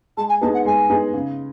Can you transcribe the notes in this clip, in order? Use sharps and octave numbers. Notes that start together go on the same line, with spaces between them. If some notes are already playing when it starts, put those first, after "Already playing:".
G#3 A5
G#5
B3 D#4 G#4 A5
F#5
G#3 G#5
B3 D#4 G#4
C#3